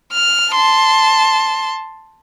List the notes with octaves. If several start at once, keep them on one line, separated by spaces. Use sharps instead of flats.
F6
A5 C6